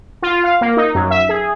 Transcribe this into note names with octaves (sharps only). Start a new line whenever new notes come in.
F4
F5
A#3
D#4
F#2
E5
G#4